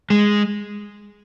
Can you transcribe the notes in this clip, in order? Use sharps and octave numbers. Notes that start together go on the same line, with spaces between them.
G#3